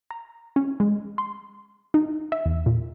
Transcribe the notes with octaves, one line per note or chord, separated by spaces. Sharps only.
A#5
C#4
G#3
C6
D#4
E5
E2
A#2